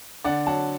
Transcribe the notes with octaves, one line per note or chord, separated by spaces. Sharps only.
D3 D5 F#5
F#3 F#5 A5